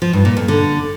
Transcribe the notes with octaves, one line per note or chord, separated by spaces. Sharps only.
F3
G2
A#2
F2
D3